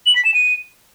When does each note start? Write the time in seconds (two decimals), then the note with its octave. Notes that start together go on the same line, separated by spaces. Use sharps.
0.06 F#7
0.16 B6
0.25 E7
0.34 D#7